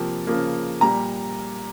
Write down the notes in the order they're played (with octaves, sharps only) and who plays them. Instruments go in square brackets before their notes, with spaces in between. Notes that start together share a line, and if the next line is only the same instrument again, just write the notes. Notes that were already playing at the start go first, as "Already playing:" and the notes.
Already playing: [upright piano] C3 F3 A#3
C#3 F3 A#3
A#2 G3 A#5